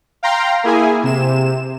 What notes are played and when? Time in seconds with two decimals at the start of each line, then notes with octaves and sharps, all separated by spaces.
0.23 F5 G5 A#5 C6
0.64 A#3 E4 G#4 G#5
1.04 C3 E7